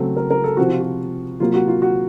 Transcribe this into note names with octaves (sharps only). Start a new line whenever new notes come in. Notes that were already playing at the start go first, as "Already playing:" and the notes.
Already playing: C#3 F#3 A3 C4 A4
A#4
A#4
A4
C3 F3 C4 F#4
F4
F#4
C3 F#3 A#3 F4
F#4
F4
F#4